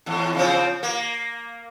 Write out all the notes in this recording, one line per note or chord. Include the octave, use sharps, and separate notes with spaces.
E2 A2
C#3 F3 C4
A#3